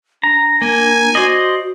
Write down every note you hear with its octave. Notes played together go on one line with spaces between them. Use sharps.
D4 A#5
A#3 G#5
F#4 C5 D5 D#5